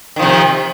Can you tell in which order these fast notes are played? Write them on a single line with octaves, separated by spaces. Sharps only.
D#3 F3 C3